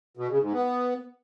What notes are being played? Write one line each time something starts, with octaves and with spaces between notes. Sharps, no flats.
B2
C#3
G#2
B3